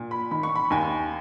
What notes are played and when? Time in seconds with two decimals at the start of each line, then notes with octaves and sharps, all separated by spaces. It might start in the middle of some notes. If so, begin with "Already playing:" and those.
Already playing: A#2
0.11 B5
0.31 D#3 B5
0.43 C#6
0.56 B5
0.70 D#2 G#5